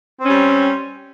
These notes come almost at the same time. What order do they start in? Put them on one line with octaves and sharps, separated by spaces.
C4 C#4 G3